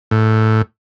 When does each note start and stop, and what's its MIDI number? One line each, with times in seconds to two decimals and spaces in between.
0.11 0.62 45